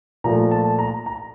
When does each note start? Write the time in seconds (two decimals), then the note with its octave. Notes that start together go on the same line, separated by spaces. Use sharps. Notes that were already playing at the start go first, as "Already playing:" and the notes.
0.24 A#2 F3 A3 A#5
0.51 A5
0.79 A#5
1.06 A#5